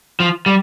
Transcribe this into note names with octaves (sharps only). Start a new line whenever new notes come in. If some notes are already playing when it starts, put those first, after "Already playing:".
F3
G3